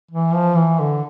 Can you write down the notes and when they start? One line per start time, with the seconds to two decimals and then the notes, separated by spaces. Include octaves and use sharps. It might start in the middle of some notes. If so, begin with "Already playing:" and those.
0.11 E3
0.34 F3
0.57 E3
0.80 D3